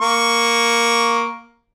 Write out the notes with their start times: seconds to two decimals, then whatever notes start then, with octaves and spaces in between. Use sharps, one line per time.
0.01 A#3 C#6